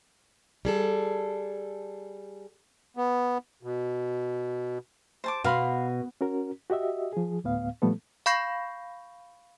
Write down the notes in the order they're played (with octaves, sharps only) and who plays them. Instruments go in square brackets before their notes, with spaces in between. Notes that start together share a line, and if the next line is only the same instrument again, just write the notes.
[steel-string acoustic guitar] G3 G#4 A4
[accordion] B3
B2
[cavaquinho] C5 A5 D6
[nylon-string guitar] B2 [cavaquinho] F5 B5 C6
[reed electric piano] C#4 F#4 A#4
F#4 G4 D#5 E5
F3 G#4
D2 A2 B3 F5
A#2 F3 G3 A3 B3 A4
[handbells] F5 B5 C#6 G6 A#6 C7